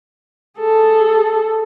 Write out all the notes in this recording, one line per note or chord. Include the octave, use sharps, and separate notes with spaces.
G#4 A4